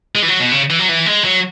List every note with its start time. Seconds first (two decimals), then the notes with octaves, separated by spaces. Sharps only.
0.15 G#3
0.22 E3
0.28 F#3
0.40 B2
0.52 C#3
0.70 E3
0.79 F#3
0.89 E3
1.06 G#3
1.24 F#3